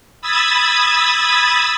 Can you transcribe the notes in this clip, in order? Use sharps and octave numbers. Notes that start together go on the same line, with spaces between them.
B5 D#6 E6 G#6 A6